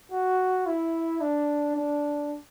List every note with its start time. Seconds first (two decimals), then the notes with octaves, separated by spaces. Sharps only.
0.12 F#4
0.66 E4
1.21 D4
1.76 D4